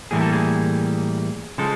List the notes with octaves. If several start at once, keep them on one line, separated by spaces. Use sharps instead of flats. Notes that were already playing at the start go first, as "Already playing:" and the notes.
A2 E3 G3 A#3 G#4
A4
G#4
C#3 F3 G#3 A4